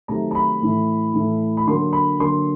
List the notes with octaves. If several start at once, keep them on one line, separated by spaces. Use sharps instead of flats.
C3 D#3 F#3 A3 A#5
A#5
B5
A2 E3 A3
A2 E3 A3
B5
D3 F#3 A#3 C6
B5
D3 F#3 A#3 C6